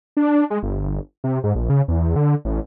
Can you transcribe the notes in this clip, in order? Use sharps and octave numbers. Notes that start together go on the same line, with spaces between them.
D4
G#3
G1
C3
G#2
A#1
C#3
E2
D3
A1